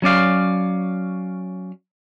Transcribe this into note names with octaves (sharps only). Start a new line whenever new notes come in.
F#3 C#4 D5 F5